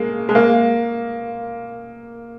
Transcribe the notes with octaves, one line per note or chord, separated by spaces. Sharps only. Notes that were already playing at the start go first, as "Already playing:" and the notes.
Already playing: G#3 A#3
G#3
A#3